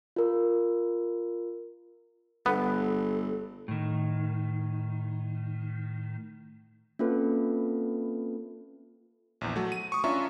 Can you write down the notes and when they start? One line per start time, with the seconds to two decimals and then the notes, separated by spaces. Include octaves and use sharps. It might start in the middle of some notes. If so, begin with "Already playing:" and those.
0.16 F4 A#4
2.46 G1 B3 A4
3.68 A2 D#3
6.99 A#3 C4 C#4 F4 A4 B4
9.41 A#1 E2
9.56 F#3 A3
9.72 D#7
9.92 C#6 D#6
10.04 C#4 D4 F4 E5 A#5 C#6